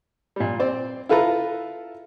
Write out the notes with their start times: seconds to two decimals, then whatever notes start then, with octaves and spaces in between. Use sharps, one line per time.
0.36 A#2 G3
0.60 C4 C5 D5
1.09 E4 F4 A4 B4 A#5